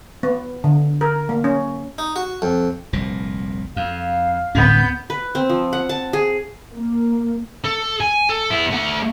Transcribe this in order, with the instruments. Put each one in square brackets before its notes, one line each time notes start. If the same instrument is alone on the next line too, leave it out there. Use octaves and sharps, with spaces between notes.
[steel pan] B3
D3
A#4
A#3
C#4
[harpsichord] D#4
F#4
F2
[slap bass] F1 C2 A#2
[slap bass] F2 [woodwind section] F5
[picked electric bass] D1 [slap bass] G1 G#2 C#4 [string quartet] B3 G6
[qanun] B4
C4
F3
F#5
A5
G#4
[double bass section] A#3
[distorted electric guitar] A4
G#5
A4
B3 E4
A3 F#5